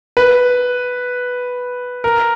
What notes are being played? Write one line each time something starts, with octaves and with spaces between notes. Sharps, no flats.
B4
A#4